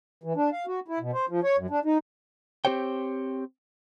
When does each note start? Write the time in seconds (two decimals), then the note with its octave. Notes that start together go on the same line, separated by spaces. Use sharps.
0.24 E3
0.36 D4
0.53 F5
0.67 F#4
0.88 E4
1.00 B2
1.13 C5
1.29 F3
1.44 C#5
1.57 F#2
1.70 D4
1.85 D#4
2.65 C4 G4 C5 C#5 G5